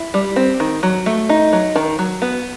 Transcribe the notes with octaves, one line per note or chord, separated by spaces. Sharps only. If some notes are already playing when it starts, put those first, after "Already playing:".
Already playing: E4
G3
C4
D#3
F#3
A3
D#4
F#3
D#3
F#3
B3